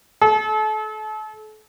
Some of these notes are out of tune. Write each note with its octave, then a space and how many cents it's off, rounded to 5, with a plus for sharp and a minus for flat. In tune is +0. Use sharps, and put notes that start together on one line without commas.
A4 -35